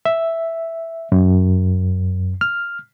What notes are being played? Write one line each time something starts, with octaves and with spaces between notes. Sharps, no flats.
E5
F#2
F6